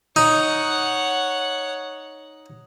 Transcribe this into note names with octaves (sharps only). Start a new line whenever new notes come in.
D#4 C#5 F#5